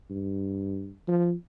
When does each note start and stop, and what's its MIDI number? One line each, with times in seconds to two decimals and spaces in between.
0.11 0.92 43
1.08 1.33 53